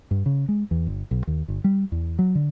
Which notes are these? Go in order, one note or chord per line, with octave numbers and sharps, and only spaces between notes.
G2
C#3
G#3
E2
G1
B1
D#2
G1
G3
E2
F#3
D3